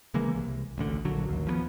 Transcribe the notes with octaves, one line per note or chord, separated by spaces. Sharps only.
C#3 E3 G#3 A#3
C2
A1 D2 D3
A#1 D3 F#3
A1 D#2
F3 F#3 B3